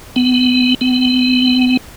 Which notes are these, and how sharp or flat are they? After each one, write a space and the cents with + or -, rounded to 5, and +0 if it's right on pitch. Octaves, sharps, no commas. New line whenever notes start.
B3 +30
B3 +40